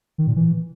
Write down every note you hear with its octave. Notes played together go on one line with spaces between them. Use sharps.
D#3
A#2
E3